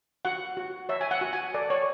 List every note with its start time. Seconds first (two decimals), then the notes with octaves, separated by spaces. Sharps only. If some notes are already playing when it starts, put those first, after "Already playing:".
0.25 F#4 F#5
0.57 F#4
0.89 C#5 E5
1.01 G#5
1.11 F#5
1.21 F#4
1.33 G#5
1.54 A4 D5
1.70 C#5